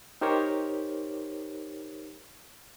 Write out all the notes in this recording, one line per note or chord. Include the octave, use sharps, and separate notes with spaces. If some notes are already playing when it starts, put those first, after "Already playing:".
D#4 G4 A#4 C5 C#5